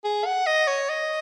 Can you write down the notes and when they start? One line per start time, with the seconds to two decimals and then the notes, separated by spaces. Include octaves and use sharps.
0.04 G#4
0.25 F#5
0.46 D#5
0.68 C#5
0.89 D#5